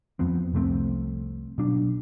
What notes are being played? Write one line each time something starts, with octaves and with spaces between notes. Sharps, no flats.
F2 F3 B3 C4
C2 F3 A3 C4
B2 F#3 D4